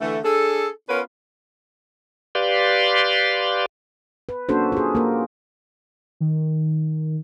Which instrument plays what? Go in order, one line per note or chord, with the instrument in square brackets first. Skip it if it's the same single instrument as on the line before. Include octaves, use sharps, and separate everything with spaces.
[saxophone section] D3 E3 A3
D4 G#4 A4
B3 C#4 F4 A#4 B4
[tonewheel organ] G4 B4 D5 F5 C6
[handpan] B4
A#3 C#4 D4 F#4 A4 C5
F4 G#4
A#3 A#4
[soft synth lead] D#3